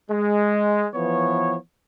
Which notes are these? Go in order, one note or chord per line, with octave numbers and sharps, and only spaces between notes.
G#3
E3 F3 B3 C#5